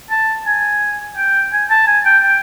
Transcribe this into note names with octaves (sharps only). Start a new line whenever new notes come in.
A5
G#5
G5
G#5
A5
G#5
G5
G5